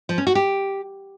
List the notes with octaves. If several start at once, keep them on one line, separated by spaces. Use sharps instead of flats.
F3
C#4
F#4
G4